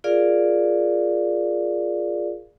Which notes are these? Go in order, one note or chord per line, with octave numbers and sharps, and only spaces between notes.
F4 G#4 A#4 D5 F5